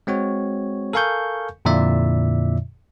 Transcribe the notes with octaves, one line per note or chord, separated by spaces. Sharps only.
G#3 C4 F#4 C#5
A4 A#4 F5 G#5 C#6 G6
F2 A#2 D3 E4 D5 E5